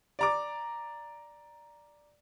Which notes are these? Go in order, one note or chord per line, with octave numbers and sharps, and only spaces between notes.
D5 A#5 D6